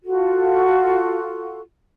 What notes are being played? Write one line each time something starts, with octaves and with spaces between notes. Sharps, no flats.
F4 F#4 A4